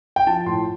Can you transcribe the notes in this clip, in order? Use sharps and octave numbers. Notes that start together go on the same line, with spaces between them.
G5
F3 A5
A2 C6